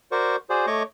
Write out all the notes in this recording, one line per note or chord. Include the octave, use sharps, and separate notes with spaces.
F#4 A#4 C5 D5 C#6
F#4 G#4 C5 D5
A3 C#5 D#5 C#6 D6